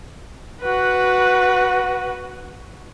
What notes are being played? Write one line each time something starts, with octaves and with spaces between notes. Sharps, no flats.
F#4 B4